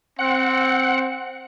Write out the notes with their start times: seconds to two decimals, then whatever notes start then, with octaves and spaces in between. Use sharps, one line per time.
0.19 C4 F#5